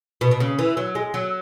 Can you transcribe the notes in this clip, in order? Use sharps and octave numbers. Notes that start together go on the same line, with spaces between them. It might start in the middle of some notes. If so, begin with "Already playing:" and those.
B2
B2
C#3
E3
F#3
G#3
F#3